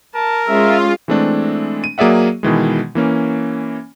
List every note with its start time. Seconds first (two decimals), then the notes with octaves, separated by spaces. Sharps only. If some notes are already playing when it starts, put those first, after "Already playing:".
0.15 A#4 A5
0.48 G#3 C#4 F4 E5
1.08 E3 G#3 A3 C4 D4
1.84 D#7
1.98 F#3 A#3 G#4 D5 E5 F#5
2.43 B2 D#3 E3 G#3
2.95 E3 A#3 C#4